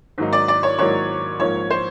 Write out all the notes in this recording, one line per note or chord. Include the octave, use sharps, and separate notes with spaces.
G#2 D#3 F#3 A#3 D#4
D5
D5
C#5
G#2 D#3 F#3 A#3 D#4 C#5
A#1 G#2 F3 A#3 C#5
C5